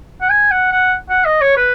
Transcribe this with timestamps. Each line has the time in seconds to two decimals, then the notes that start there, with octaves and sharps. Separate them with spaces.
0.21 F#5
0.30 G#5
0.51 F#5
0.72 F#5
1.09 F#5
1.25 D#5
1.41 C#5
1.57 B4